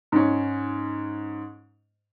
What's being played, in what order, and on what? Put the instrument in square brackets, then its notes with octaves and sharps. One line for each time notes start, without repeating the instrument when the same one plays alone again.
[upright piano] G#2 C#4